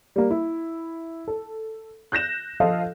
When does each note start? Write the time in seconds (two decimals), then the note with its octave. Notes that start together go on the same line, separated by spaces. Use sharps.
0.16 G3 A#3
0.30 E4
1.28 A4
2.12 F#6 G6 A#6 E7
2.60 F3 F4 A4 D#5 F5